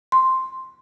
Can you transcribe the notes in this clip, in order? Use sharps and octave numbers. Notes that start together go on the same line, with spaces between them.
C6